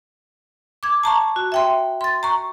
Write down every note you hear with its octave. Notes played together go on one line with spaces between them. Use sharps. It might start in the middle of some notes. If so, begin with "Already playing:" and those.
D6 G#6
A5 A#5 C#6
F#4
E5 G5 C6
C6 A6
A#5 C#6